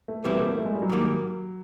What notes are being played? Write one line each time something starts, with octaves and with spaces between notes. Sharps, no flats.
A3
E2 B2 G3 B3 C4 E4
A#3
A3
A#3
A3
G#3
G3
F#3
G#2 D#3 G3 A#3